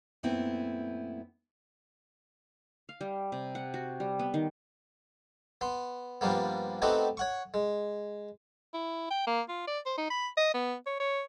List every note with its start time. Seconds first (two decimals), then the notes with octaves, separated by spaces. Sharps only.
0.23 F#2 A#2 A3 B3 C4 E4
2.89 F5
3.01 G3
3.32 C3
3.55 F#5
3.74 F#4
4.00 G3
4.19 B3
4.34 D#3
5.61 B3 C6
6.21 G2 F3 G3 A#3 B3
6.82 A3 B3 C4 D#4 F#4 G4
7.17 C#5 F#5 C#6
7.54 G#3
8.74 E4
9.10 G5
9.27 A#3
9.49 F4
9.67 D5
9.86 C5
9.98 D#4
10.10 B5
10.37 D#5
10.54 B3
10.86 C#5
11.00 C#5